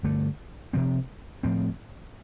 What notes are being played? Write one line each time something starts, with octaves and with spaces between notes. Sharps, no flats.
G2 D3 A3
C3 F3 C4
A2 F3 C4